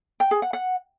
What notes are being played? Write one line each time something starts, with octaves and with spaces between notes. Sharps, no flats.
G5
G#4
F#5
F#5